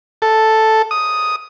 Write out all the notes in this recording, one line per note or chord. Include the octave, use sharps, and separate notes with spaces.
A4
D#6